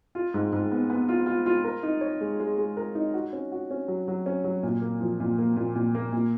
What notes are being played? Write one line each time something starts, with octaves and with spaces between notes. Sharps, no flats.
F4
G#2
G#2
B3
B3
F4
F4
F4
A#4
D#4
C#5
G#3
G#3
G#3
A#4
D#4
F#4
C#4
F#4
C#4
F#3
F#3
C#4
F#3
A#2
A#3
F3
A#2
A#3
A#2
A#2
A#3
A#2